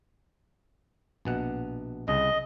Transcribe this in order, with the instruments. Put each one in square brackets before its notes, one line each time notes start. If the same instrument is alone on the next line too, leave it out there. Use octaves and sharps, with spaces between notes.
[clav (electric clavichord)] A#1 B2 F#5
[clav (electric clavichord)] C2 C#3 [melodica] D#5